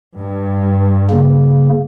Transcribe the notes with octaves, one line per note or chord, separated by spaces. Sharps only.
G2
C#3 A#3